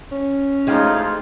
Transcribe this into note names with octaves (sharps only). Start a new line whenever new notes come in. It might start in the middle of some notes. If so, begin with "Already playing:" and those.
C#4
A1 F2 G#3 A3 D#4 F4 G4